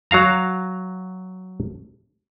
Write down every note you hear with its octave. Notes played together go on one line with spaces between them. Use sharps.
F#3 F#4 F5 A#5